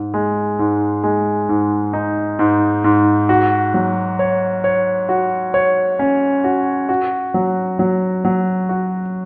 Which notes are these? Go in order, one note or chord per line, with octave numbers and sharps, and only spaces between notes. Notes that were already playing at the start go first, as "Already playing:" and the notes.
Already playing: G#2
G#3
G#2
G#3
G#2
D#4
G#2
G#2
F#4
F#3
C#5
C#5
F#4
C#5
C#4
F#4
F#4
F#3
F#3
F#3
F#4